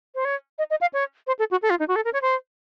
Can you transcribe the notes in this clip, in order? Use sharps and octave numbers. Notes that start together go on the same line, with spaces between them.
C5
C#5
D#5
D#5
F5
C#5
C5
A4
F#4
A4
F4
D#4
F#4
A4
A#4
C#5
C5